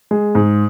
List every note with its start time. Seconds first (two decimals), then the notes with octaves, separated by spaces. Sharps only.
0.11 G#3
0.35 G#2